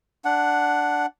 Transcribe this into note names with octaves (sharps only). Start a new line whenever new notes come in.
D4 F#5